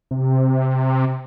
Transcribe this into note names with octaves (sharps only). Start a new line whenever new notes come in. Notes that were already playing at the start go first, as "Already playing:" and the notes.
C3